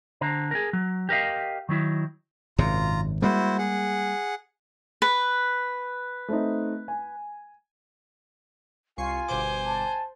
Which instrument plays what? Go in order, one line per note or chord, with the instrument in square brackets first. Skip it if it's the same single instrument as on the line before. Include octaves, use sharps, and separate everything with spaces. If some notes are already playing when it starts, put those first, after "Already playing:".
[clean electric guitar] D3 C5 A#5
G#4 A#4
F#3
G4 A#4 D#5 F5
D#3 F#3 E4
[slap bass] G#1 F#2 C3 [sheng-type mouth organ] F4 A#5
[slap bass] G3 G#3 A#3 [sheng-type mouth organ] E4 F#4 C5
[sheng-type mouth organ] G#4 F#5
[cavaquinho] B4
[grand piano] A3 C4 D#4
G#5
[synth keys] C2 C#6 C7 [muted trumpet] F4 [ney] G#5
[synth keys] G1 B2 D6 [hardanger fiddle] C5
[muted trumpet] A5